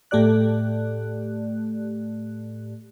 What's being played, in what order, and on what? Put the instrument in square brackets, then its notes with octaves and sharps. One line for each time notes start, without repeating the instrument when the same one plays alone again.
[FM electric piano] A2 A3 G4 D5 F#6